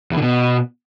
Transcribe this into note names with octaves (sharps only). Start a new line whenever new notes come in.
E2
D3
B2